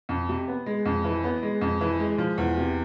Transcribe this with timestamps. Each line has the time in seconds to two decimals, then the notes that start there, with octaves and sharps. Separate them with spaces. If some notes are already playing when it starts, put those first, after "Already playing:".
0.09 F2
0.29 C3
0.48 B3
0.66 G#3
0.85 F2
1.04 E3
1.24 B3
1.43 G#3
1.61 F2
1.81 E3
1.99 G#3
2.18 F3
2.38 E2
2.57 C3